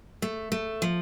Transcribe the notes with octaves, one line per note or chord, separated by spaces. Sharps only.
A3
A3
F3